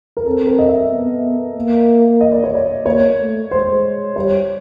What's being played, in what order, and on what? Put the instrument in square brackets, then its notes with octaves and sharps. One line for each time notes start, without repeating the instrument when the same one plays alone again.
[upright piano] A#4
[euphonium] C4 [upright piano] A4
[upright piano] A#4
D#5
E5
[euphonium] B3
A#3
[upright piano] D#5
D5
C#5
D5
[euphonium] A#3 [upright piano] C#5
[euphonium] A3
[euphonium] G#3 [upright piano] C5
[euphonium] G3 [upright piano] C#5